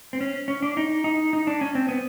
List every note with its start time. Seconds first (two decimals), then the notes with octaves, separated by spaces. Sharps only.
0.13 C4
0.21 C#4
0.48 C#4
0.62 D4
0.77 D#4
1.04 D#4
1.33 D#4
1.47 D4
1.61 C#4
1.75 C4
1.89 B3